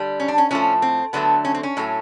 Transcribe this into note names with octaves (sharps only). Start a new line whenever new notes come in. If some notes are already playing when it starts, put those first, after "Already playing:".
Already playing: D3 G3
C#4
D4
C#4
A2 F3 A3 C#4
C4
D3 F#3 A3 B3
C#4
C4
C#4
A2 F#3 A3